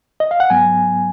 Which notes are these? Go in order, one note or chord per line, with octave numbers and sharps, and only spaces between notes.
D#5
F5
F#5
G#2 F#3 B3 G#5